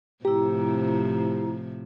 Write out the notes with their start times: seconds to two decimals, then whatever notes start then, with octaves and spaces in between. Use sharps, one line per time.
0.25 A2 C3 F3 E4 G4 A#5